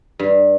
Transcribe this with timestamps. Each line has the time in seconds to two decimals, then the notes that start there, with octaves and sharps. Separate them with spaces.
0.19 G2